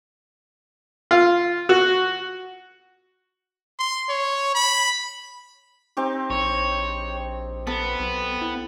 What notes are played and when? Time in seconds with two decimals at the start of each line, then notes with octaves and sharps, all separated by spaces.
1.11 F4
1.69 F#4
3.79 C6
4.09 C#5
4.55 B5
5.97 C4 D#4 G4
6.30 A#1 C#5
7.67 B3 A4
8.00 B1
8.41 E4